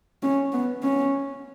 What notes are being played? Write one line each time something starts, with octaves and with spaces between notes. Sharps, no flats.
C#4
B3
C#4